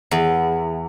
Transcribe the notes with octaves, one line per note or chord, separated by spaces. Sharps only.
E2